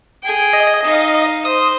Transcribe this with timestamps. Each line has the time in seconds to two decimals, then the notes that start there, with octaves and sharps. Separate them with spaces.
0.23 G#4 G5
0.53 D#5
0.85 D#4 F5
1.45 C5 D#6